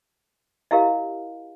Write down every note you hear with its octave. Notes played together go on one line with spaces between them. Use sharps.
E4 G4 A#4 D#5 F5